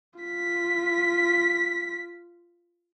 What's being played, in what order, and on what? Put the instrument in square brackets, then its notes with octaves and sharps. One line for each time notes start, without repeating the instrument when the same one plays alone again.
[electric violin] F4 B6